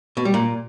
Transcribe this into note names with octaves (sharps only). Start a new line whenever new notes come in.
B2
G3
A#2